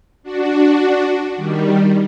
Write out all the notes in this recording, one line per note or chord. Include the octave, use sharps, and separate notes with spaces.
D4 F#4
D#3 G3